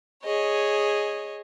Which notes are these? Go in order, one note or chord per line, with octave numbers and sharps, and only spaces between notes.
G#4 C#5 D#5